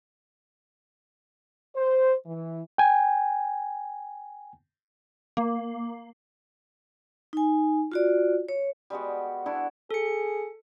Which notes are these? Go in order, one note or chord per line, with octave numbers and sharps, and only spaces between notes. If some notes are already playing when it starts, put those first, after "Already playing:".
C5
E3
G5 G#5
A#3
D#4 G#5
F4 F#4 D5
C#5
G3 G#3 B3 F#4
D4 E4 F#4
G#4 A4 C#7